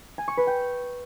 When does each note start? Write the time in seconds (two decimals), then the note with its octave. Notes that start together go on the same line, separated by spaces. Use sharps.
0.18 G#5
0.28 C#6
0.37 B4
0.47 G5